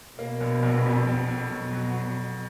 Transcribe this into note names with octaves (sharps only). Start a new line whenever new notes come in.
B2 A#3
A#1
A#1
F2
F2
F2
B2 F#3
F#3